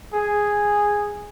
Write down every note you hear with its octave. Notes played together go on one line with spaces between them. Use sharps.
G#4